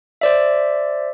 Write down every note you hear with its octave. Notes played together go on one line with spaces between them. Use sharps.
C5 D5 E5